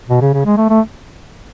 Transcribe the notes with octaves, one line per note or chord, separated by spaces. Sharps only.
B2
C#3
C#3
G#3
A3
A3